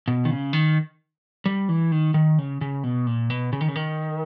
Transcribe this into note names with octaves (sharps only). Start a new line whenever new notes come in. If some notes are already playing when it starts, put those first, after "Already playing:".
B2
D#3
C#3
D#3
G3
E3
D#3
D#3
C#3
C#3
B2
A#2
B2
C#3
D#3
C#3
D#3